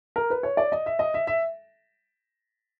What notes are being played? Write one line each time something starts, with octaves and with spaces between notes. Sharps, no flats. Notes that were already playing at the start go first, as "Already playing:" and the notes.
A#4
B4
C#5
D5
D#5
E5
D#5
E5
E5